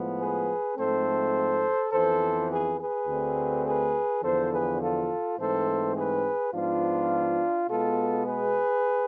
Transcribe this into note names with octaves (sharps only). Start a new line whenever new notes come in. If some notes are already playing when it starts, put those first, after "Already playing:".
Already playing: A2 F3 G#3 B3
G#4 B4
G#2 F3 A3 C4 A4 C5
F2 E3 B3 A4 C5
G#4 B4
G#4 B4
D2 D3 A3 C4
G#4 B4
E2 D3 F3 A4 C5
G#4 B4
F4 A4
G#2 E3 A3 C4 A4 C5
G#4 B4
G#2 F3 B3 D4 F4
B2 G#3 B3 F4 A4
G#4 B4